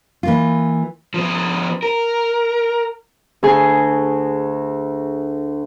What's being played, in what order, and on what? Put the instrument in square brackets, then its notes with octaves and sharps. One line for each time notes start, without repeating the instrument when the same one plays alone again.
[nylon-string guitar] E3 A#3 F4
[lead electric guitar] F3 B3
A#4
[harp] D2 G#4